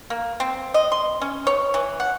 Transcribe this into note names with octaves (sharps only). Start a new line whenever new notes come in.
A#3
C4
D#5
C6
C#4
C#5
E3
F#5